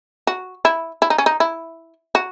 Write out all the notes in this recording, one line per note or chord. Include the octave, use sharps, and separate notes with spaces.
F#4
E4
E4
D#4
C#4
D#4
E4
F#4